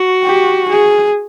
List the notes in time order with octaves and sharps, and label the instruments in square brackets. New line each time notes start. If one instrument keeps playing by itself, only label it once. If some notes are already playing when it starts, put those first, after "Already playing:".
Already playing: [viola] F#4
[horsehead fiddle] G4
G#4